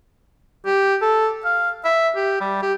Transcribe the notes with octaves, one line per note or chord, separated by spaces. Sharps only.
G4
A4
F5
E5
G4
G3
G4